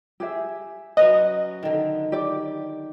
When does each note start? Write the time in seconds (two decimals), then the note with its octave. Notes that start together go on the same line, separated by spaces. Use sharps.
0.20 G4 G#4 E5
0.97 F#3 C#4 B4 D#5
1.63 D3 D#3
2.12 G4 D5